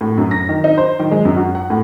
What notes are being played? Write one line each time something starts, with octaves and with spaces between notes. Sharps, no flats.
A2
F#2
A#6
D#3
D#4
C5
D#3
G#3
F#2
F#4
F#5
A2